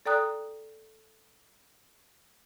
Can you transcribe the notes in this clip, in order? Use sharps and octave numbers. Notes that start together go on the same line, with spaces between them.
A4 D5 G5 A#5 D#6 F#6